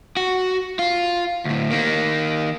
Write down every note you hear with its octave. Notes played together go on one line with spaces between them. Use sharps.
F#4
F4
D2 A2
D#3 A#3